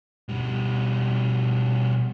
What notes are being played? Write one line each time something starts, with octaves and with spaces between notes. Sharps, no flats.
B2 G3